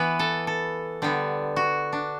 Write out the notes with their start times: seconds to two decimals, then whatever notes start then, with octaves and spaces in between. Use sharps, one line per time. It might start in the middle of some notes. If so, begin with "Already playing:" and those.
Already playing: E3 B3 B4
0.19 A4
0.47 A4
1.02 D3 G3 B3
1.56 F#4
1.93 D4